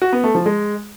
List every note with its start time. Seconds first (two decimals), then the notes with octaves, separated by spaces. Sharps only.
0.02 F#4
0.13 B3
0.24 A3
0.35 F3
0.46 G#3